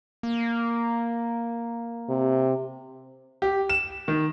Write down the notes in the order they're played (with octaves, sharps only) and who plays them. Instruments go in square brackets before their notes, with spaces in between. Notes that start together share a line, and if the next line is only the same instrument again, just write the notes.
[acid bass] A#3
[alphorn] C3
[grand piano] G4
E7
D#3